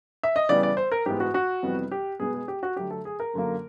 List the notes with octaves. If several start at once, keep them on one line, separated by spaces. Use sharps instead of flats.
E5
D#5
C#3 E3 G3 B3 D5
D5
C5
A#4
G#2 E3 G#3 B3 G4
F#4
F#4
F2 C3 E3 G3 B3
G4
B2 G#3 B3 G#4
G#4
G4
F#4
D3 F#3 A3 G4
A4
G#4
A#4
F#2 D3 F#3 A#3